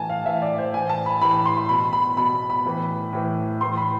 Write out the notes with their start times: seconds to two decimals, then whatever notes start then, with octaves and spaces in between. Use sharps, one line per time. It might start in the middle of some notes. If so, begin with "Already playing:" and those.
Already playing: A2 E3 G#5 A5
0.10 F5
0.26 A2 E3 E5
0.42 D5
0.58 C5
0.74 A2 E3 G#5
0.89 A5
1.06 B5
1.21 A2 E3 B5
1.45 C6
1.69 B2 B5
1.93 B5
2.17 B2 B5
2.50 B5
2.65 A2 E3
3.13 A2 E3
3.61 A2 E3 C6
3.77 B5